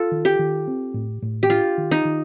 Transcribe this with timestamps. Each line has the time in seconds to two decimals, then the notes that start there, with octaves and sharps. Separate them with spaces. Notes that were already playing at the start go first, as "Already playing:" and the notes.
Already playing: F4 A4
0.12 D#3
0.25 G4
0.39 D#3
0.67 C4
0.94 A2
1.22 A2
1.43 G4
1.49 D4 F4
1.78 D#3
1.91 D#4
2.05 D#3